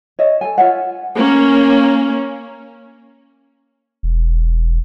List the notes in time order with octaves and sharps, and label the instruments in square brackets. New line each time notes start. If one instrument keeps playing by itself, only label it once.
[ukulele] C#5 D#5 E5
A4 G#5
F4 C#5 E5 F#5
[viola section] A#3 C#4
[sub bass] E1